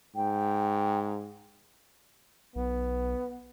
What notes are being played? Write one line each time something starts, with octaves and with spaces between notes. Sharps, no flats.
G#2 G5
B1 B3